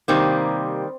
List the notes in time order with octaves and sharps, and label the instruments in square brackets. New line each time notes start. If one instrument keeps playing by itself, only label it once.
[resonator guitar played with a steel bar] C3 D#3 G3 A#3 C4